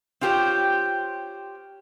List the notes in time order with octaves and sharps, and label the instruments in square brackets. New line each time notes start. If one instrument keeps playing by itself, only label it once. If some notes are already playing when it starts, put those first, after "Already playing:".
[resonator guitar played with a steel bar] C4 F4 G4 G#4 C5 C#5